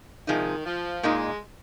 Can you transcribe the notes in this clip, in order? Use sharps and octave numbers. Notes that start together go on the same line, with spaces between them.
C3 D#3 F3 G#3 D#4
F3
A#2 G#3 A#3 D#4